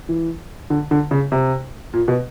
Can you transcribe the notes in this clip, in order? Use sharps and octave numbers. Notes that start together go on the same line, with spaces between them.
E3
D3
D3
C#3
C3
A#2
B2